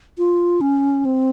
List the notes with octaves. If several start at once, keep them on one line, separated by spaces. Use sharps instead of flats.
F4
C#4
C4